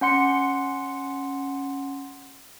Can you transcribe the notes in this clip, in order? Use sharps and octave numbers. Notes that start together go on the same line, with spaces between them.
C#4 F#5 C6 C#7